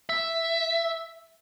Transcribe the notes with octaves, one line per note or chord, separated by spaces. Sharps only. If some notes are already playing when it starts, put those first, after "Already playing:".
E5